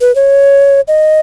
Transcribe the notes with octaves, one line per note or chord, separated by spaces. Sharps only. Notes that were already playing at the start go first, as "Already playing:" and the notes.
B4
C#5
D#5